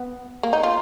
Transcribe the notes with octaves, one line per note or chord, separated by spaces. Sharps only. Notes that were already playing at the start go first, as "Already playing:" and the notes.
Already playing: B3
A#3
D#4
F4